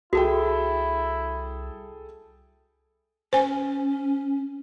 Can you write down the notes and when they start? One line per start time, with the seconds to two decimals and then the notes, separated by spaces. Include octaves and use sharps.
0.13 C2 E4 F#4 G#4 A4 G5
3.33 C#4 C5 G#5